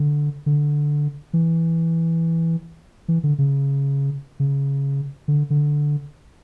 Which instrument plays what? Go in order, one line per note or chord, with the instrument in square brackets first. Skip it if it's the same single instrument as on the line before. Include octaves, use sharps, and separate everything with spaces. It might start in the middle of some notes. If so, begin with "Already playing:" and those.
Already playing: [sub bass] D3
D3
E3
E3
D3
C#3
C#3
D3
D3